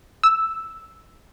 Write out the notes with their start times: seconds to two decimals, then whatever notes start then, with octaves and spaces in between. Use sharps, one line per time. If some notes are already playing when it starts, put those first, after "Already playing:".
0.24 E6